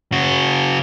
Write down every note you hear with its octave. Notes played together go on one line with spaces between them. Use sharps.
C#3 F#4